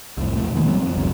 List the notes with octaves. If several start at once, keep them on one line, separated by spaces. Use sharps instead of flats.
C2 F2 A2
A#1 E2 B2 A3
D#3 G#3 A#3 B3
F#3 G3 B3 C4
F2
F#1 C#2 F#2 D3